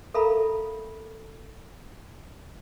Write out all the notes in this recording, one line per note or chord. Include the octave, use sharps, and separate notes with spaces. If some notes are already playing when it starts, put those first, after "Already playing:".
A4 A#4 E5 F5 A#5 B5